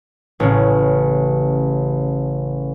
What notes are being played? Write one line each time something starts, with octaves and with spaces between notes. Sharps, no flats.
A1 C#3